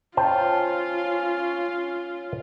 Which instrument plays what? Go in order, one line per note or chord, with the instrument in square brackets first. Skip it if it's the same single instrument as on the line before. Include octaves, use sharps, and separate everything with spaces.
[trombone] C#4 [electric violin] F4 [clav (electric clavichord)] C5 G5 A5